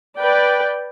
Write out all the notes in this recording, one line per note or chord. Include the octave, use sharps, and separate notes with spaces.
B4 D5 G5